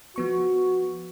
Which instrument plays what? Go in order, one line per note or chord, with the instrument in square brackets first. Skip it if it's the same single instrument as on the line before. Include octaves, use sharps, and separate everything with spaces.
[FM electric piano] F3 B3 C#6 [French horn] F#4